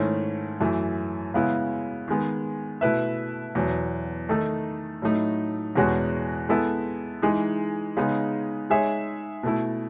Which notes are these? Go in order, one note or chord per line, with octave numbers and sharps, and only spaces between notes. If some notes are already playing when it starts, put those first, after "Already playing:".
Already playing: G#2 D#3 A3 C#4 E4
F#2 E3 A3
C#3 G#3 B3 E4
D#3 G#3 B3
B2 A3 E4 B4 E5
E2 B2 F#3
D#3 A3 D#4 A4
A2 F#3 A3 D#4
E2 B2 G#3 C#4 F#4
G#3 B3 E4 A4 E5
E3 G#3 D#4
C#3 G#3 B3 D#4 G#4
G#3 D#4 G#4 C#5 E5
B2 A3 E4